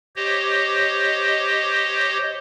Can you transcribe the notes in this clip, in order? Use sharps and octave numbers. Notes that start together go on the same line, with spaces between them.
G4 C5 C#5 D#5